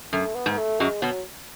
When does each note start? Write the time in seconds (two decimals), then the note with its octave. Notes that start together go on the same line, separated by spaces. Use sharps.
0.13 F#2 A3
0.35 B3
0.46 G#2
0.52 B3
0.57 A3
0.80 F#2 F#3 G#3
1.02 B2 F#3 B3